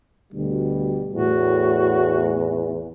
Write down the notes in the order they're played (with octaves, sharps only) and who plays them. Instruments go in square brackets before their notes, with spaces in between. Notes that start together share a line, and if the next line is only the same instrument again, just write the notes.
[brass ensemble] D2 B2 G3
[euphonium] E2 [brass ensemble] A2 [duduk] F#4